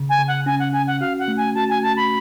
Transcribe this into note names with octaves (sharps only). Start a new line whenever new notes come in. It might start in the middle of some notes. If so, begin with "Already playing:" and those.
Already playing: C#3
G#5
C#3
F#5
C#4 G#5
F#5
C#4 G#5
F#5
F#4 F5
F#5
A3
G#5
F#4 A5
G#5
A3 A5
B5